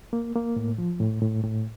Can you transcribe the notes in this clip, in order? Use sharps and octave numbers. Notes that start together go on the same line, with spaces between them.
A#3
A#3
A2
F3
A2
A2
A2